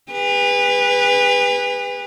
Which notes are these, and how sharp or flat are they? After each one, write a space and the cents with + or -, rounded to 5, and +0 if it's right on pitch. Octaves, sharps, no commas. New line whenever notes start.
G#4 -45 B4 +0